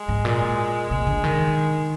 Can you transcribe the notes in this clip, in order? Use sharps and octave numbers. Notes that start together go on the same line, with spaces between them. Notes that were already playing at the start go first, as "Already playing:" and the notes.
Already playing: G#3
G#2
A#2
C3 G#3
D3
D#3